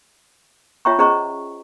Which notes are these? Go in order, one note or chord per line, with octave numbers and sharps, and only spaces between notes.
F4 C#5 E5 G5 A#5 C#6
C#4 G#4 C5 D#5 A#5 C#6